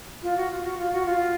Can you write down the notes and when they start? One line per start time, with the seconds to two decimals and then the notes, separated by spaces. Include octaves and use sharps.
0.23 F4
0.37 F#4
0.51 F4
0.64 F#4
0.78 F4
0.93 F#4
1.06 F4